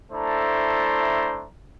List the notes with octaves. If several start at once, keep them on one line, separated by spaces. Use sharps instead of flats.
A3 D4 E4 A4 C5 A#5